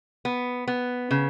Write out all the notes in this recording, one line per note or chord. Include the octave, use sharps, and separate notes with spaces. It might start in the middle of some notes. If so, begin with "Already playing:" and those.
B3
B3
C#3